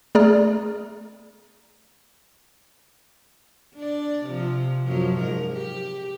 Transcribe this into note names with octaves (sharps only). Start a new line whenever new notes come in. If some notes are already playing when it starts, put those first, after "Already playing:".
A3 G#4 D5 A#5 F6
D4 D5
C3 F3
F#2 F3 F#3
G#2 A#4
G4